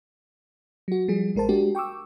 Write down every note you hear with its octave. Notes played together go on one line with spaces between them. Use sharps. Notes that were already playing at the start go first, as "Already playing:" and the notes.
F#3 F#4
F3 G3 G#4
A1 G#3 A#4 C5 A5
G#3 D4 F#4 G4
G5 C#6 D6 E6